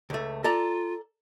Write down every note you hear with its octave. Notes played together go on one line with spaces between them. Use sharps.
C#2 A3
F4 A4 D5 A#5